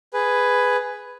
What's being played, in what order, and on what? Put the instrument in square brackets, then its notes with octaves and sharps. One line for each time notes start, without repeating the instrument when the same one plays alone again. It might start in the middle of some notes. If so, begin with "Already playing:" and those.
[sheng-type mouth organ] G#4 B4